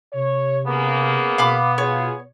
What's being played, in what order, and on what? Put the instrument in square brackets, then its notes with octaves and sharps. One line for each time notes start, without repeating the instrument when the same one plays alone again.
[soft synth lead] C3 [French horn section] C#5
[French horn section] C#3 A#3 G#4 [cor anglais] B3
[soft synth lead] B2 [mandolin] F5 B5 D6
[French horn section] F4 G#4 [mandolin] C#5